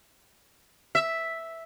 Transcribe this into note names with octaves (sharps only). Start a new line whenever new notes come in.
E5